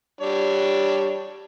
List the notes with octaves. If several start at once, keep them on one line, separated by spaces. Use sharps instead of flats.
G3 D4 C#5